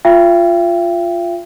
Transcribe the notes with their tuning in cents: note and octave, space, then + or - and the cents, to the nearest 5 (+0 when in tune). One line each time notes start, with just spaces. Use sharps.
F4 +0 E5 +45 G5 +0